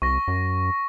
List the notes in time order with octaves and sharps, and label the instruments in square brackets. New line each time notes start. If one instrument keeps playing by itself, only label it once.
[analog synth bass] C2 [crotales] C#6 A#6
[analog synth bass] F#2